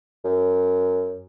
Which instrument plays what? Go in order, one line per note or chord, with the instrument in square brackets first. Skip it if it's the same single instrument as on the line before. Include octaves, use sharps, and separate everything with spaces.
[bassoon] F#2